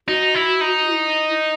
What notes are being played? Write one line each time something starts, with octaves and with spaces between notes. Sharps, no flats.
D#4 F#4
E4
D#4
F4
E4